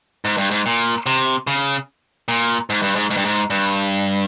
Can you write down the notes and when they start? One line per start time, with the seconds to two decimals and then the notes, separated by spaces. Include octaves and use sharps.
0.25 G#2
0.38 G2
0.51 G#2
0.66 A#2
1.06 C3
1.47 C#3
2.28 A#2
2.70 G#2
2.82 G2
2.96 G#2
3.10 G#2
3.17 G2
3.25 G#2
3.50 G2